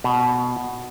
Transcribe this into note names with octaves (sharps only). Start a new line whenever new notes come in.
B2